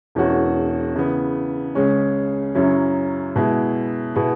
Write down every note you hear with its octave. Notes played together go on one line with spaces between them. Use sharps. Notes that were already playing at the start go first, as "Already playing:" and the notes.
E1 E2 E3 C#4 F#4
C#3 E3 B3
C#2 C#3 G#3 C#4
F#2 C#3 F#3 C#4 E4
B2 G#3 E4
B2 B3 E4 G#4